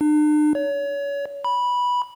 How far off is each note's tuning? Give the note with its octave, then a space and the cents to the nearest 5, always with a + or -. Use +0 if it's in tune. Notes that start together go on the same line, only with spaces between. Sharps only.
D4 +45
C#5 +30
B5 -10